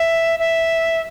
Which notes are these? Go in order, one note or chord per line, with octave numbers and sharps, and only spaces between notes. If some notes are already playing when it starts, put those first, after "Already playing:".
Already playing: E5
E5